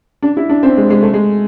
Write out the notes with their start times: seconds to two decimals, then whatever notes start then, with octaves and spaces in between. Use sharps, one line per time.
0.22 D4
0.37 E4
0.49 D4
0.63 C4
0.77 G#3
0.90 G#3
1.02 A3
1.13 G#3